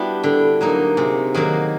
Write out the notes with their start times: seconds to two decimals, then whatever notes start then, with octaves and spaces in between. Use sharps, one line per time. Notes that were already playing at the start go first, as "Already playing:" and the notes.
Already playing: G3 B3 D4 E4 F#4 G4
0.24 D3
0.61 F#3 A#3 D#4
0.97 C3 F#4 G#4
1.34 D#3 F#3 A#3